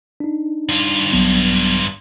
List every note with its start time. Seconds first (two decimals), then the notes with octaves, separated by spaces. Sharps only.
0.20 D4 D#4
0.69 G2 F4
1.13 A#1 F#3 B3